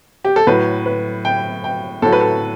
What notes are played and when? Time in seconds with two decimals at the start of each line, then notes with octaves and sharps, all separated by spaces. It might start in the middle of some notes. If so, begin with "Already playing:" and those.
0.25 G4
0.36 A4
0.47 A2 F#3 B4
0.86 B4
1.25 G5
1.64 G5
2.02 A2 F#3 A4
2.12 B4
2.21 A4